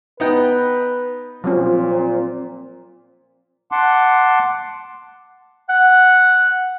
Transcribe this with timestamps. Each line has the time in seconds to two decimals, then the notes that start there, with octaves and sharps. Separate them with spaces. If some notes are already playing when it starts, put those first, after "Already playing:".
0.20 B3 D#4 B4 G5
1.44 A#2 F3 F#3 C4 C#4
3.72 F#5 A5 C6 D6
5.69 F#5